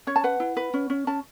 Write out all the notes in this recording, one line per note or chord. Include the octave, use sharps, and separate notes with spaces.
C#4 C#5
A5
B4 F#5
E4
B4
C#4
C#4
C#4 A5